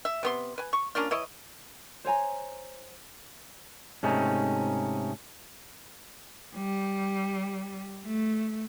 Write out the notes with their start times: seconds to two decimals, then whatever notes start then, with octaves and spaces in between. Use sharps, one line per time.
0.05 E5
0.23 C3 B3 C6
0.58 B4 G#5
0.73 C#6
0.95 A#3 C#4 D4 F4
1.11 E3 E4 C#5 D#5
2.05 C5 C#5 G#5 A#5
4.03 G#2 C3 A3 C#4 D#4
6.55 G3
8.06 A3